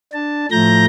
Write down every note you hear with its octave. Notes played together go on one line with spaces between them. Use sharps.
D4 A5
A2 F3 A3 A#5 G6 A#6